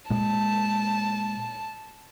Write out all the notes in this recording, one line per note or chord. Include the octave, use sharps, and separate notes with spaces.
A#2 G#3 A5